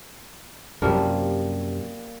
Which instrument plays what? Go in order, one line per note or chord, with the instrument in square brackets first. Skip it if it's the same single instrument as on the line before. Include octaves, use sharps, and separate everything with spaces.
[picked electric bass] F#2 C3 [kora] F3 G3 A#3